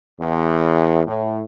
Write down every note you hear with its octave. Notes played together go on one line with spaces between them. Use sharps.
E2
A2